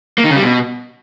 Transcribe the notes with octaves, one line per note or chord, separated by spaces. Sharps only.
A#3
D#3
C#3
G3
B2